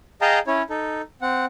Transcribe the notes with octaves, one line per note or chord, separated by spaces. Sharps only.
G#4 D#5 F5 G5 A5 A#5
C#4 E4 C#5
D#4 A4
C4 F#5